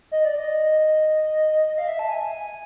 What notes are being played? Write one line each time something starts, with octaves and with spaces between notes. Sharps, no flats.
D#5
D5
D#5
F5
E5
A5
G#5
G#5